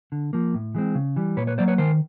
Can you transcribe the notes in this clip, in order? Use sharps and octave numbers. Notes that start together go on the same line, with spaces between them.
D3
F3 A#3
A2
E3 G#3 C4
C#3
E3 G3
A#2 B4 C#5
B4 C#5
F#3 A#3 C5 D5
B4 C#5
D#3 A#4 C5